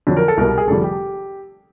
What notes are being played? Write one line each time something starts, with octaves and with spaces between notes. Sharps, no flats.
F2 D3 F#3
A#4
A4
C2 B2 G3 A#4
G#4
F1 F2 D3 G3 A4
G4